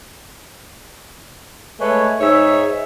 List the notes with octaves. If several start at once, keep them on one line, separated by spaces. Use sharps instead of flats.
G#3 A3 B4 C#5
G#2 D#4 C#5 E5